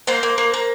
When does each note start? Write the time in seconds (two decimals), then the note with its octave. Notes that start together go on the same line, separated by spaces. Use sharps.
0.07 A#3 C5
0.23 A#3
0.38 A#3
0.54 A#3